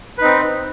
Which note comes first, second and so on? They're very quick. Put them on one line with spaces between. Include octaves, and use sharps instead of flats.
B4 D#4 C4